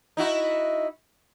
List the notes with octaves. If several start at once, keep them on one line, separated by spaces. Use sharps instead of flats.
D#4 E4 F#4